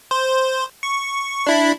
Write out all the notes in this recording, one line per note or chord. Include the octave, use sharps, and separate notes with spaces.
C5
C#6
D4 E4 B5